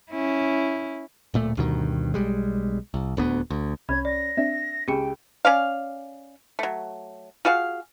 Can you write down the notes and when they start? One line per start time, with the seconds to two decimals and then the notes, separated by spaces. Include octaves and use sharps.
0.11 C#4 E4
1.34 D1 A#2 A3
1.57 D2 G2 B2 D#3
2.14 B1 G3 G#3
2.94 C2
3.17 D#1 D2 B3
3.50 D2
3.89 C2 C#4 B5 G#6
4.05 D5 A#6
4.37 C4 D4 E5
4.88 C#2 G4 G#4 G5 C#7
5.45 C#4 D5 F5
6.59 F#3 A3
7.45 F4 F#4 G#4 F5